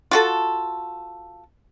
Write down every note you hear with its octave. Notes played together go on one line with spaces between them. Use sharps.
F4 F#4 A4